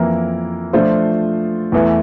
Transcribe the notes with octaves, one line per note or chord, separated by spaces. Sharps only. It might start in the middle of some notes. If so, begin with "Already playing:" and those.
Already playing: F2 E3 A#3 E4 A#4
F3 A3 D4 F4 C5
E2 E3 A3